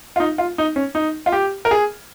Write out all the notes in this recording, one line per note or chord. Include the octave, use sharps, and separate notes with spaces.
F4
D#4
F4
D#4
C#4
D#4
F4
G4
A#4
G#4